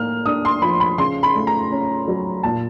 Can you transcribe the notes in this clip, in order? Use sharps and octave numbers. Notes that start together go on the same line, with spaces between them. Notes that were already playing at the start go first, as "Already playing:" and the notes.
Already playing: A2 A#3 F6
D4 D#6
C6
F3 B5
B5
C#3 C6
B5
A3
A#5
C#4
F#3
A#2 A5